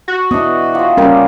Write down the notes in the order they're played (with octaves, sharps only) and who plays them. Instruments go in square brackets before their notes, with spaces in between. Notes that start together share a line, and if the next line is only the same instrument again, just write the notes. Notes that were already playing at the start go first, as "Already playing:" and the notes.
[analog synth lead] F#4
[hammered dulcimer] E3 D4 D#5 [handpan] B3
[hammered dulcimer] F#3 F4 G4
[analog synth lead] G3 [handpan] C#4 A#4